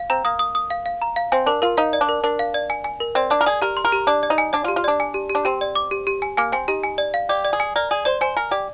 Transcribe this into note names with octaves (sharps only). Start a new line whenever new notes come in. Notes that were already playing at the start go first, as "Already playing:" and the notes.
Already playing: F5
C4 A#5
A#3 D#6
D#6
D#6
F5
F5
A#5
F5
C4 G#5
D4 A#4
F4 A#4
D#4 F5
D5
D4
A#4
D4 A#4
F5
D5
G#5
G#5
A#4
C4 D5
D4 D5
A#4
G#4 D5
G4 A#4
C6
A#4
G4
D4 D5
D5
D#4
G#5
D4 D5
F4
G4
F4
D4 D5
G#5
G4
G4
D4
C4 G4
D5
D6
G4
G4
G#5
A#3 G#5
C4 G#5
D#4 G4
G#5
D5
F5
G4 D5
D5
G#4
G#5
A#4 D5
G#4 D5
C5 D5
C5 G#5
A#4 G#5
G4 D5